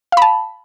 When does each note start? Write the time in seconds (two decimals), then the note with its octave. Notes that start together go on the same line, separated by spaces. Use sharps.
0.12 F5
0.17 B5
0.22 A5